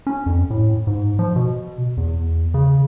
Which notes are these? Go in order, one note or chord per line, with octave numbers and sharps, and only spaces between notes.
C#4
F2
A2
G#2
F3
B2
E2
C#3